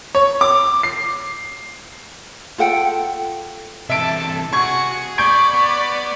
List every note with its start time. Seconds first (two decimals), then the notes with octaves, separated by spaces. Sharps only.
0.15 C#5
0.41 D6
0.83 C7
2.58 F4 A4 F#5 G5
3.90 C3 E3 A4 E5 A5 D7
4.53 F#4 G#4 C#6 G#6 C#7
5.18 D5 B5 C#6 G6 G#6 D7
5.54 B3